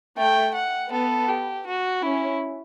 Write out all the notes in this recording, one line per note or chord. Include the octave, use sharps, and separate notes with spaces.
A3 G5
F#5
B3 A4
G4
F#4
C#4 E4